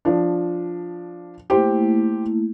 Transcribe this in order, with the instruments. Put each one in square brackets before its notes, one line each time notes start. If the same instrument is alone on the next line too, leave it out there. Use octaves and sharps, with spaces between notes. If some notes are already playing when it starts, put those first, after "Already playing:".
[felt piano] F3 D4
[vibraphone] A3 A#3 E4 [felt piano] G4 C5